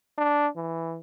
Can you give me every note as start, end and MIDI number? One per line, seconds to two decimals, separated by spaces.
0.18 0.48 62
0.56 1.00 52